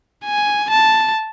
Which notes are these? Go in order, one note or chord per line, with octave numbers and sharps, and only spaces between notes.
G#5
A5